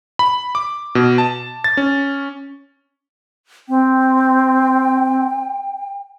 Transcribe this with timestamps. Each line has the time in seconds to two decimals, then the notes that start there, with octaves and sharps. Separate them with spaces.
0.19 B5
0.55 D6
0.95 B2
1.18 A5
1.64 A6
1.77 C#4
3.69 C4 G5